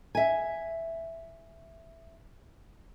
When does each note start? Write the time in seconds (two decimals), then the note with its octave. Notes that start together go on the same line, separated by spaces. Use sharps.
0.15 E5 G#5